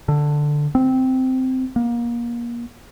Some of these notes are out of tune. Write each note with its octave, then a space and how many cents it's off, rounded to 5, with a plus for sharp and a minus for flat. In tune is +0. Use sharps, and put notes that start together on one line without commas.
D3 +5
C4 -10
A#3 +30